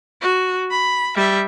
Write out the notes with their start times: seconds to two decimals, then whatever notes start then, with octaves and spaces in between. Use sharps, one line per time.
0.21 F#4
0.71 B5
1.16 G3 E5